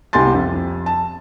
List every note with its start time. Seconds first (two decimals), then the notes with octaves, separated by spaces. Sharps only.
0.13 C2 G4 G#5 C6 A6
0.34 F2
0.86 A5